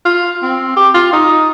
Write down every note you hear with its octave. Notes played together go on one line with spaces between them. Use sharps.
F4
C4
G4
F4
D#4